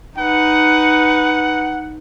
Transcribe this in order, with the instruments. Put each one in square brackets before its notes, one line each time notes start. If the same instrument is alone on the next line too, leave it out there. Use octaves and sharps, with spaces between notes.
[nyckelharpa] D#4 B4 [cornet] F#5